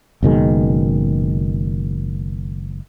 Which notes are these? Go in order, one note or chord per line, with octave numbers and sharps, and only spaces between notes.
F#1 B2 D#3 G#3